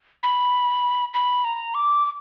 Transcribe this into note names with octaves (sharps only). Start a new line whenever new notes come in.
B5
B5
A#5
D6
D6